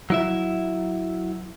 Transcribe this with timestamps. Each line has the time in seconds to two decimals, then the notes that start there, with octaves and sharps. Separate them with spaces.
0.10 F#3 E4 E5